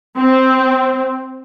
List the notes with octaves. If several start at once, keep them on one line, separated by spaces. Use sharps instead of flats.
C4